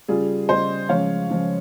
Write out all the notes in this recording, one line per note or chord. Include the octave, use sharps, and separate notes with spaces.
C#3 G3 F4 G#4
C#3 G3 C5 D#5
C#3 F3 G#3 C#5 F5
C#3 F3 G#3